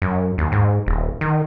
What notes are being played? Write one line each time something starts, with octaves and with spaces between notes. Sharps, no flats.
F#2
D#2
G#2
D#1
D#3